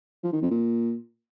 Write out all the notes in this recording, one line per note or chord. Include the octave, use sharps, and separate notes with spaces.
F3
D#3
F2
A#2